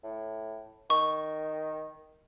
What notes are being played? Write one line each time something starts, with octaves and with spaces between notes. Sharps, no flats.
A2
D#3 C#6